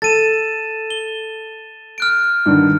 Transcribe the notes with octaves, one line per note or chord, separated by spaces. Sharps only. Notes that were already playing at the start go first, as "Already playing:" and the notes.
A4 A6 D#7 E7
G7
F6 F#6 D7
G2 D3 D#3